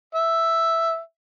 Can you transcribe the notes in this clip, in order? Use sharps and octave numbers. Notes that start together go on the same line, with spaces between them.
E5